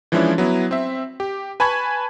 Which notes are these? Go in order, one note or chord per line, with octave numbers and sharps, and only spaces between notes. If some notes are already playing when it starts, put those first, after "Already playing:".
E3 F3 G#3 C#4 D4 E4
F#3 B3 E4
C4 E5
G4
B4 G#5 A5 B5 C#6 G#6